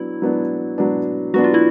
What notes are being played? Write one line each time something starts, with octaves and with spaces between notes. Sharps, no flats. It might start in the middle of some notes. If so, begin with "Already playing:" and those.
Already playing: F#3 B3 D4 E4
F#3 B3 D4
F#3 B3 D4
F#3 B3 D4 F#4
F4
E4 F#4